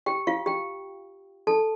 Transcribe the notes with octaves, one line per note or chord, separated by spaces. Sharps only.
G4 G5
F4 F5
G4 G5
A4 A5